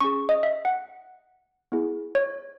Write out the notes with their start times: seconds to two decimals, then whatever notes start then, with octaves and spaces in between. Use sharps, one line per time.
0.01 C#4 G#4 C#6
0.29 D#5
0.43 E5
0.65 F#5
1.72 B3 E4 G#4
2.15 C#5